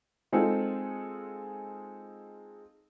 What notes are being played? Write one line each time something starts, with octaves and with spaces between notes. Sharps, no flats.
G#3 C4 D#4 F4 G#4 A4